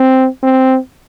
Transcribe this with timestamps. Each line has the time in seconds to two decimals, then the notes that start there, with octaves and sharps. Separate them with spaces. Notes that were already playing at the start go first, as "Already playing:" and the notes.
Already playing: C4
0.43 C4